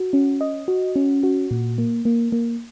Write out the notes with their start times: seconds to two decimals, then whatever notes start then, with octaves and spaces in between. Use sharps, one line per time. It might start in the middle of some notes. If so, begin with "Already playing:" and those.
Already playing: F#4
0.13 C#4
0.41 D#5
0.68 F#4
0.96 C#4
1.23 F#4
1.51 A#2
1.78 A#3
2.05 A#3
2.32 A#3